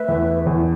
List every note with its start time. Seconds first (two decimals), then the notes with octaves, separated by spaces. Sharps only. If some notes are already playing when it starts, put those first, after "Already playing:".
Already playing: A3 B4 E5
0.08 E2
0.46 E2